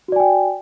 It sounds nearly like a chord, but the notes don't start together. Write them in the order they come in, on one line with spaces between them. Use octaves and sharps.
F#4 D5 G#5 G5